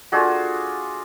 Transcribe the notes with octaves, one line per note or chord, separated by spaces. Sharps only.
A3 D4 F4 F#4 G#4